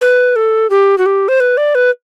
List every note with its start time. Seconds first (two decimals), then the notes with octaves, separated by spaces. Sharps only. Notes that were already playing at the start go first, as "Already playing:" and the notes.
0.01 B4
0.36 A4
0.70 G4
0.98 F#4
1.06 G4
1.28 C5
1.40 B4
1.57 D5
1.75 B4